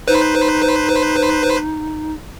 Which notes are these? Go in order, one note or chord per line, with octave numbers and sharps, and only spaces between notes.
D#4 B4 C5